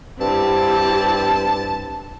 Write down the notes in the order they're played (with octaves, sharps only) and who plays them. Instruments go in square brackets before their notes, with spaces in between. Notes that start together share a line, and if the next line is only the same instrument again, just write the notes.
[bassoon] G2 [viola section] C4 E4 G4 [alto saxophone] A5